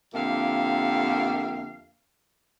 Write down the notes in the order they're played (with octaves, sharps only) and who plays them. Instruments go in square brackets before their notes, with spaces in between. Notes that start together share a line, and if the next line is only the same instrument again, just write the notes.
[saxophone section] F2 D3 A#3 G4 E5 F5